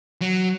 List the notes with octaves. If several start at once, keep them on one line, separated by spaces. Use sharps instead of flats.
F#3